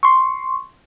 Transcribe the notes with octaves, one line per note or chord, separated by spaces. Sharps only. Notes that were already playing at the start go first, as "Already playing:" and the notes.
C6 C#6